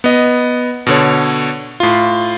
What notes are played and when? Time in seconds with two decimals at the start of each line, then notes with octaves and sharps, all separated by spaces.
0.04 B3 D#5
0.87 B2 D3 C#5
1.80 A2 F4